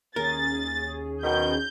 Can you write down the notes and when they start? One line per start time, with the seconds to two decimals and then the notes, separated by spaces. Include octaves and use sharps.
0.16 D#2 C#4 G#4 A#4 A6
1.24 B2 D#3 G6